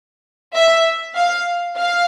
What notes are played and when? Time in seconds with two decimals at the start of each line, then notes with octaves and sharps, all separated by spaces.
0.55 E5
1.16 F5
1.77 F5